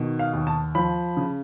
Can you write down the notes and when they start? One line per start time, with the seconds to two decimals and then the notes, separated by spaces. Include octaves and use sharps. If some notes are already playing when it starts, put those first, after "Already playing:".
Already playing: B2 D#3
0.19 F5
0.33 D#2
0.47 A5
0.75 F3 B5
1.17 C#3